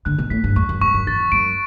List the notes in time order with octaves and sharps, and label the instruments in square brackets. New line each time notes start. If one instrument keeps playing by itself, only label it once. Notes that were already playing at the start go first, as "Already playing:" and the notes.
[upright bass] D3 [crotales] F#6
[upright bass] B2
[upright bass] A2 [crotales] B6
[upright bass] G2
[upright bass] E2 [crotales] C#6
[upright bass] F#2
[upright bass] G2 [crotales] C#6
[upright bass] F#2
[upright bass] E2 [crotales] A6
[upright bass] F#2 [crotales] D7